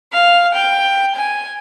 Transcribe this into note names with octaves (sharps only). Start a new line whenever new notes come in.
F5
G5
G#5